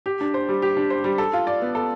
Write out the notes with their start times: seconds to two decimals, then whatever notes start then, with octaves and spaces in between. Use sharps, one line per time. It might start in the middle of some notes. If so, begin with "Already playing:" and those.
0.06 G4
0.21 D4
0.34 C5
0.49 G3
0.62 G4
0.77 D4
0.90 C5
1.04 G3
1.18 A4
1.33 F4
1.47 D5
1.62 B3
1.75 A4